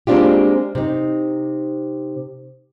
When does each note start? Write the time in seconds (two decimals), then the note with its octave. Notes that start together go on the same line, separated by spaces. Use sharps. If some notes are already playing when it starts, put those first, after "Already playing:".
0.07 G#3 A#3 C4 D4 F4 G4
0.75 C3 D#4